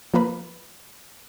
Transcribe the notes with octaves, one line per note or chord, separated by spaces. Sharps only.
F3 A#3 A#4 B4